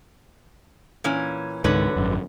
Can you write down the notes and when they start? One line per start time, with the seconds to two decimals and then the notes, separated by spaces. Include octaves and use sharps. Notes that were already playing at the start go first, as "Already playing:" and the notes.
1.04 A#2 E3 C#4
1.64 C#2 G#2 D3 D#3 B4 C#5
1.96 G#1 F#2